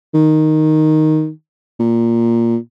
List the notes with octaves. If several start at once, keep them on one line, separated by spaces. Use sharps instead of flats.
D#3
A#2